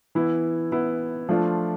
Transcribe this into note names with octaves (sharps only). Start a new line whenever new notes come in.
E3 B3 E4
E3 B3 E4
F3 A3 D4 F4